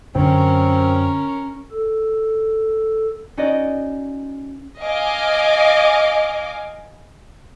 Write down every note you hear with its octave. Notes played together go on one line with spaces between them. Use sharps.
F#2 D3 C4 C#4 A#4
A4
C#4 D#4 F#4 D5 D#5
D#5 F5 G#5 D6